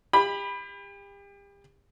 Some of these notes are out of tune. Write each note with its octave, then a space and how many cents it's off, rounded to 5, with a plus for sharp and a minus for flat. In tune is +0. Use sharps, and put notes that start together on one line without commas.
G4 +35 B5 +0